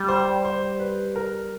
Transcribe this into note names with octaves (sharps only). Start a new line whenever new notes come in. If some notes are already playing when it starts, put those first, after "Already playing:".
Already playing: G3
C5
C5
B4
A#4